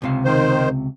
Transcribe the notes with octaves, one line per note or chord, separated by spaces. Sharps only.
C#2 C3 F5
D#3 C5